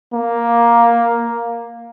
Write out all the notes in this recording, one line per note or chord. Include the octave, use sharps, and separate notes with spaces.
A#3